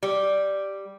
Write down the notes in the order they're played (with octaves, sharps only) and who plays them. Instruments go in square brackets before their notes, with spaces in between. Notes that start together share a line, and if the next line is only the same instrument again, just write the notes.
[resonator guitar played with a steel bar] G3